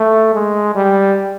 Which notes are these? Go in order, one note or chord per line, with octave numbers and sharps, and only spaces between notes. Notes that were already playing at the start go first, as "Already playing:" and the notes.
Already playing: A3
G#3
G3